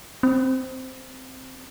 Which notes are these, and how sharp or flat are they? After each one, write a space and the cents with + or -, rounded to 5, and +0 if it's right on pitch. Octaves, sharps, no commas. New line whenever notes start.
C4 -5